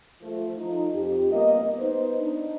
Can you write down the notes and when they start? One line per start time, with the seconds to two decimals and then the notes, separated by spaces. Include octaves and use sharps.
0.22 F3 A3
0.57 F3 D#4
0.93 F2 G4
1.31 G3 A#3 B3 D#5
1.78 B3 D#4 B4 C5
2.18 D4 D#4